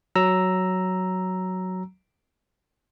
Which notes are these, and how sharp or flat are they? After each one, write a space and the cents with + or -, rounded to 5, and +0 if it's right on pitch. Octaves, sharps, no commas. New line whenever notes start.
F#3 +0 A#5 +0 E6 +0